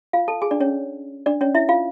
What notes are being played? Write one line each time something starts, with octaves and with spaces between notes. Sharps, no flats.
F4 F5
A4 A5
G#4 G#5
D4 D5
C#4 C#5
D4 D5
C#4 C#5
E4 E5
F4 F5